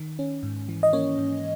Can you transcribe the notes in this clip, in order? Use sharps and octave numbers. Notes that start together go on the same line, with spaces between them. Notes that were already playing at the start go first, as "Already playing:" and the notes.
Already playing: D#3
C#4
G#2
E3
D#5
A#3 C#4 C#5
G#2